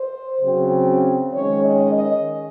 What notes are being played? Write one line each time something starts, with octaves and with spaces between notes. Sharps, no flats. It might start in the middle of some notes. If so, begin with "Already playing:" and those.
Already playing: C5
C#3 F#3 C4
D#3 G#3 C#4 C#5
D#5
D#5